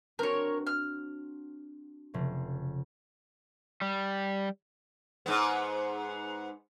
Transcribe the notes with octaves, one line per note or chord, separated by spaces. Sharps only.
C4 D4 F#4 A#4 C#5
F6
F1 C#3
G3
G#2 B3